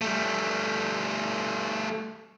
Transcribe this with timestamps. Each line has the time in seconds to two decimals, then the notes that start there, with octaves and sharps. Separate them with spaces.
0.01 G3 A3